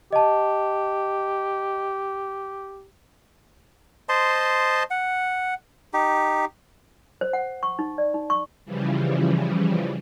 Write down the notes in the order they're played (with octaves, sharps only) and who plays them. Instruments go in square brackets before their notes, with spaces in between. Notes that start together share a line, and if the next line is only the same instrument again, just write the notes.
[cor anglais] G4 [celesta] D#5 A5
[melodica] C5 D#5 A5 C6
F#5
D#4 G4
[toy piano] C5
F#5
C#6
D#4
D5
D#4
C#6
[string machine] C#3 E3 F3 G3